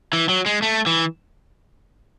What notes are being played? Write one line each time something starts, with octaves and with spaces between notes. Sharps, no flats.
E3
F#3
G#3
A3
E3